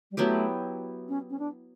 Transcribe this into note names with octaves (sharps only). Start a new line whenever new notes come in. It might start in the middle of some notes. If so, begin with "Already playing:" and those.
G3
F#3 A3 B3 E4 G4
C#4
C#4
D4